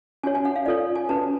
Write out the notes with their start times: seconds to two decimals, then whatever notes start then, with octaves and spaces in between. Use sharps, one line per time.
0.23 C#4 F#4 C#5 G#5
0.35 G#5
0.45 F#5
0.56 F5
0.66 F4 A4 C#5 D5
0.95 G#5
1.09 C#4 F#4 B4 A5